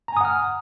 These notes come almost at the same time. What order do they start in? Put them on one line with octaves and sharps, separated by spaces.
A#5 G#5 D#6 F#5 F6